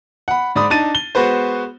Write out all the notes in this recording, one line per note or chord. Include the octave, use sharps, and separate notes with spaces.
F#5 B5
G#2 D5 B5 D#6
D4 D#4 A5 A6 D#7
G7
G#3 B3 F#4 B4 C5